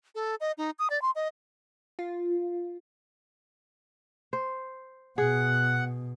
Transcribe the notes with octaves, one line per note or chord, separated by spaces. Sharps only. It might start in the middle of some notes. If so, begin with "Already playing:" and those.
A4
D#5
D#4
D#6
D5
C6
D#5
F4
C5
B2 G#4 F#5